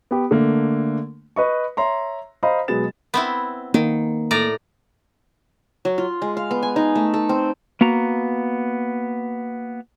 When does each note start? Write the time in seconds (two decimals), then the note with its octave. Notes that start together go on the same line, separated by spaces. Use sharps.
0.11 B3 G4
0.31 D3 A3 A#3
1.36 B4 D#5 C#6
1.77 C#5 E5 A#5 C6
2.43 C5 D#5 F5 A#5 B5
2.68 B2 F#3 G#3 B3 A6 E7
3.14 B3 C4 E4
3.74 D#3 A#3
4.31 A2 D5 A#5
5.85 F#3
5.98 F4
6.22 G#3
6.37 F5
6.51 B3
6.63 G#5
6.76 D#4
6.95 A3
7.14 A4
7.29 C4
7.81 A#3 B3 F#4 A#5